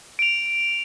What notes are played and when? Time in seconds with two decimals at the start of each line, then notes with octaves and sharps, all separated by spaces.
0.19 D7 F7